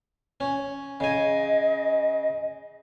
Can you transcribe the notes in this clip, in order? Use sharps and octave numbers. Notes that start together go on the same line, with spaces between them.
C#4
C#3 D#5 G#5